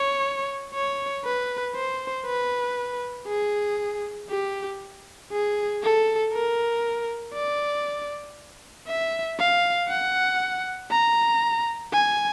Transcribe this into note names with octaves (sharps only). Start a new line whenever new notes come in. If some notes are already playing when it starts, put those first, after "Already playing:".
Already playing: C#5
C#5
B4
C5
B4
G#4
G4
G#4
A4
A#4
D5
E5
F5
F#5
A#5
G#5